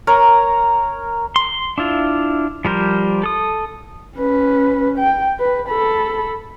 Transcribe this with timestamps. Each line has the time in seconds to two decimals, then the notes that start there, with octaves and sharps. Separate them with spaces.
0.07 A#4 C#5 A#5
1.36 C6
1.78 D4 E4 F4
2.65 F3 G3 A#4 C5
3.23 A4 D#6
4.18 C#4 B4
4.98 G5
5.39 B4
5.69 A4 B5